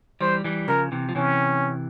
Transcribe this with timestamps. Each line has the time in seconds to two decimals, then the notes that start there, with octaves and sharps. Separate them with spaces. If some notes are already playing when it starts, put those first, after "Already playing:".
0.21 E3 G3 C5
0.44 E3 G3
0.68 C#3 F3 A#4
0.92 C3 E3
1.09 F3
1.15 C3 E3 C#4